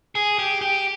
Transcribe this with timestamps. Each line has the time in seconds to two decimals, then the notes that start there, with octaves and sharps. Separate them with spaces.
0.15 G#4
0.39 G4
0.61 G4